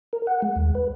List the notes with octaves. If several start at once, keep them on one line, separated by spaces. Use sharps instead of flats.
A#4
F#5
G#3
D#2
B4